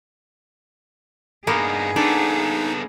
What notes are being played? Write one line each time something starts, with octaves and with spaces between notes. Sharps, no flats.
G2 A#3 B3 D#4 G#4
B3 D4 D#4 A4